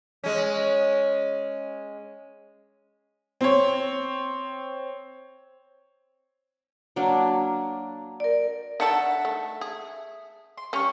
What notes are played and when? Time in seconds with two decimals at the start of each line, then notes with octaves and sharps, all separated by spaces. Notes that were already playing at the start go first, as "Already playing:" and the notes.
0.24 G#3 C#4
3.41 C4 C#5
6.96 F#3 A#3 D4
8.20 A#4 D5
8.80 D#3 D4 A4 E5 F#5 A5
9.25 A3
9.61 G#4
10.58 C6
10.73 G3 C#4 F5 C#6